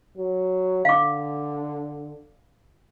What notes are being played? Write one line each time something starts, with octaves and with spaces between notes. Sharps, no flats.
F#3
D3 F5 D6